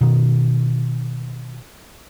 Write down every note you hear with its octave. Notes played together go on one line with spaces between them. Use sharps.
B2 D#3